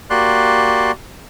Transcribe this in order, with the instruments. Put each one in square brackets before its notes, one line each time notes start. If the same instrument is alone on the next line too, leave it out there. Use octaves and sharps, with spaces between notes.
[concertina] A#3 F#4 G4 D5 C6 F#6